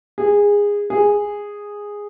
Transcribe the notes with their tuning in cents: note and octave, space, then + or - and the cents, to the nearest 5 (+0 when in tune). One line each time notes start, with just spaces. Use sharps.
G#4 -20
G#4 -10